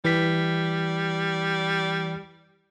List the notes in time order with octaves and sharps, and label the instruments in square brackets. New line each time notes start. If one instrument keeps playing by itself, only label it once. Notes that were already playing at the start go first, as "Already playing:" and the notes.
[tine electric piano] E3 B6 [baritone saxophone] G3